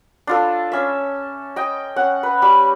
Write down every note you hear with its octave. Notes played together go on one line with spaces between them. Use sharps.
D4 F4 A4
C#4 E5
D#5 G5
C#4 F#5
B4
G3 B5 C#6